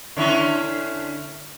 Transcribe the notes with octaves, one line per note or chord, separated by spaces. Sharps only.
D3 C#4 E4